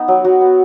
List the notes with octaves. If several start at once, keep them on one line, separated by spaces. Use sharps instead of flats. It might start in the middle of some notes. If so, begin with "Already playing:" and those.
Already playing: B3 D#4
F#3
F#3 F#4
B3